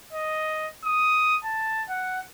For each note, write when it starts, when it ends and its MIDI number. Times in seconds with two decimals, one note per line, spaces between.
0.13 0.68 75
0.84 1.37 87
1.44 1.83 81
1.89 2.20 78